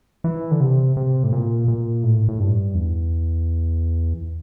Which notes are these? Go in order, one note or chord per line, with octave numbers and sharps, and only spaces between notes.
E3
D3
C3
C3
A2
A#2
A#2
A2
A2
G2
E2